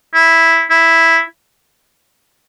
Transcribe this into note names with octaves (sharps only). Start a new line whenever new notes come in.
E4
E4